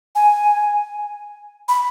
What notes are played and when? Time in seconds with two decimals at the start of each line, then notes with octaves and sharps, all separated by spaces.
0.15 G#5
1.68 B5